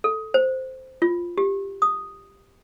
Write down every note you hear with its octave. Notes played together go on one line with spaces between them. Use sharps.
A4
C5
F4
G4
D#6